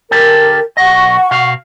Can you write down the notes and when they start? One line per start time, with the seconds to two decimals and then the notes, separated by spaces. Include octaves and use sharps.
0.11 D3 G4 A4 A#4
0.77 B1 D#5 F#5 C#6
1.31 B2 F5